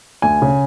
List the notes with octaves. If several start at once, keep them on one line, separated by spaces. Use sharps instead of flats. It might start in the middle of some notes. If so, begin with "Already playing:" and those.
D2 G#5
C#3